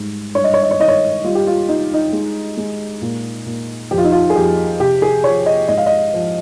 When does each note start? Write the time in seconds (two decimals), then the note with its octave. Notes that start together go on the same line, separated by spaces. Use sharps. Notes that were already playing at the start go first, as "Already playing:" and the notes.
Already playing: G#2 G3
0.35 G2 C#5
0.44 D#5
0.54 C#5
0.63 D#5
0.71 C#5
0.80 D#3 D#5
0.88 C#5
1.24 G3 F4
1.35 G4
1.47 F4
1.69 G3 D#4
1.94 D#4
2.13 G#3
2.57 G#3
3.02 A#2
3.46 A#2
3.91 F2 G4
3.98 F4
4.04 D#4
4.12 F4
4.30 G#4
4.35 F2 G4
4.80 C3 G4
5.02 G#4
5.24 F3 C#5
5.46 D#5
5.68 G#2 D#5
5.78 F5
5.86 D#5
6.14 F3